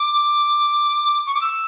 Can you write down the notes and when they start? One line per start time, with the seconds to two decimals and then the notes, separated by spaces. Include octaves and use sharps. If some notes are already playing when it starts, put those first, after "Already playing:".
Already playing: D6
1.27 C#6
1.34 D6
1.41 E6